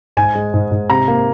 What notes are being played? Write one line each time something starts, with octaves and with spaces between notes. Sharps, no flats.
G#2 G#5
G#3
G#2
G#2
C3 A#5
A#3